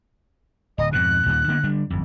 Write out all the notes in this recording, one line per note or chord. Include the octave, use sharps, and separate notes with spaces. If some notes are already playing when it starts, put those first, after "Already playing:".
D1 D#5
F2 G#2 B2 F#6
D#2 A#2 D#3
D3 A#3 B3
D3 G3 D4
G1 F2